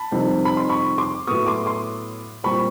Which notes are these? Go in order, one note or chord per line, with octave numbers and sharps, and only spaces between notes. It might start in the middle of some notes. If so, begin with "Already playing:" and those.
Already playing: A5 B5
F2 C3 D#3 G3 C4
B5
C6
B5 C#6
C6 D6
A2 F#3 B3 C#6 D#6
C6 D6
C6 D6
A#2 G3 C4 B5 C#6